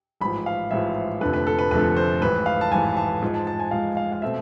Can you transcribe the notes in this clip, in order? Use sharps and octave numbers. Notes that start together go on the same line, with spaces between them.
A1 G#2 F3 B5
F5
A1 G#2 F3 E5
F1 F2 D3 A3 B4
B4
A4
B4
F1 F2 D3 A3 B4
C5
A1 G#2 E3 B4
F5
A5
A1 G#2 E3 G#5
A5
G#2 F3 G#3
A5
A5
G#5
G#2 F3 G#3 F5
F5
F5
B2 A3 C4 E5